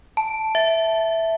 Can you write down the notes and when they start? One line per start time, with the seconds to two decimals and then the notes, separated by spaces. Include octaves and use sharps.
0.17 A5
0.55 E5